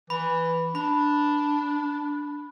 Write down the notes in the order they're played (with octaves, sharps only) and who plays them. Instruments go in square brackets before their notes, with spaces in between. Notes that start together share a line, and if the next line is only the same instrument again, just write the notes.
[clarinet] E3 [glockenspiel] B5
[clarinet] D4 [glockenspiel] B5